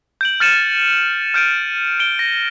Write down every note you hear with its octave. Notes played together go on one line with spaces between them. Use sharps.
G6 D7 F#7
F6 G6 A6 C#7 D#7 E7
F6 G6 D7 D#7
D7 G7
A#6